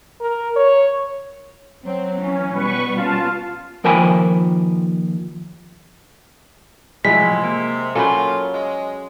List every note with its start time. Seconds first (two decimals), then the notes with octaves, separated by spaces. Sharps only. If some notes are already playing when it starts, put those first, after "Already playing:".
0.21 A#4
0.56 C#5
1.86 F#3 C4
2.21 E3 C#4
2.52 B2 G3 B3 B4 C#6
2.95 C#4 F4 A5
3.84 D#2 F3 A#4 G5 G#5 B5
7.05 A2 C3 F3 F#3 G#3 C4 E4 B6
7.44 A#3
7.95 F#3 A#3 C#4 F4 A4 B5
8.53 G#3